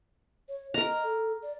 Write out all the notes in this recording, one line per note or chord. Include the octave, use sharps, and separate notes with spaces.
C#5
A#4 D#5 A#5
A4
D5